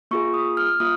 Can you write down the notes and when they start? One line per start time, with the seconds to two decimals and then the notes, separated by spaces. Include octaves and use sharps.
0.11 A#3 F4 G#4 C#6
0.34 D#6
0.57 F6
0.80 A#3 F4 D#6